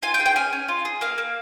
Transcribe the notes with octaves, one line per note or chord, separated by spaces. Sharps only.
F4 G#5
G5
G#4
G5
C#4 G#5
C#4
F4
G#4
A#3 F5
A#3